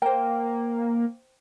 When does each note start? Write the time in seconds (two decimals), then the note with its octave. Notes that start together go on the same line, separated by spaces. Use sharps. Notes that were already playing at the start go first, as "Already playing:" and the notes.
0.02 A#3 C5 G5